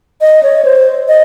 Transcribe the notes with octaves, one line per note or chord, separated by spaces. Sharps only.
D#5
C#5
C5
D#5